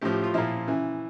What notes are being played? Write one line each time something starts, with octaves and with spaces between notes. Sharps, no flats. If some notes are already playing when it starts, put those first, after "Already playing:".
A2 F3 G4
G4
F4
A#2 F3 E4
C#3 E3